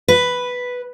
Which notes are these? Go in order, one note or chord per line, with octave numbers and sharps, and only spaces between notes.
B4